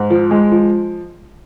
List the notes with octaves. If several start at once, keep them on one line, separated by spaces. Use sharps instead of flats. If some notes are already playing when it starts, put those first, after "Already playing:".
Already playing: G#2
F3
G#3
F3